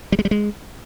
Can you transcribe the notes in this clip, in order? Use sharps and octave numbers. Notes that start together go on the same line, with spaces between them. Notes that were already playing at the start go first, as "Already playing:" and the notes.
G3
G#3
G3
G#3